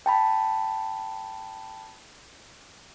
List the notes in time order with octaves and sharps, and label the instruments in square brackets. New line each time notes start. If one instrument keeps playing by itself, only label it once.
[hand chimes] G5 A5 B5